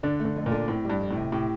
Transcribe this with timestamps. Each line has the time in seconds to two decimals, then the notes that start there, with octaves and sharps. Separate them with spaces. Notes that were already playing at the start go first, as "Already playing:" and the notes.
0.03 D3 D4
0.20 A3
0.25 D3
0.36 F2
0.46 A#2
0.51 D3
0.68 A2 C4
0.85 G2 G3
1.00 F2
1.11 A2
1.16 C3
1.32 A2 G4